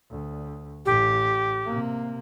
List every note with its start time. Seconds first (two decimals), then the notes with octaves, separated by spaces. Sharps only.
0.10 D2
0.86 A1 G4
1.65 C3 A#3